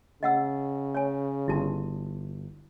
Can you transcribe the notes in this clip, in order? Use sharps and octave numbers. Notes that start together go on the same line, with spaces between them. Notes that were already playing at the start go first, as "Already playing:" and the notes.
C#3 D#5 F#5 E6
C#5 G#5
G1 E4 F#4 A5